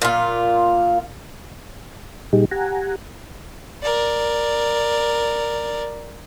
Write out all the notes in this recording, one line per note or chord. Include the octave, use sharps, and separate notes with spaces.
A#2 F4
A#2 G3 D#4 G4 G#4
G4 F#5 G#5 A#5
A#4 D5